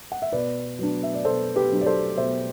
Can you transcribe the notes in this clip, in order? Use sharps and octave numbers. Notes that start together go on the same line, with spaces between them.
F#5
E5
B2 B4 D5
F#3 B3 D4
E5
D5
B2 A4 C5
G4 B4
F#3 B3 D4
D5
A4 C5
B2 C5 E5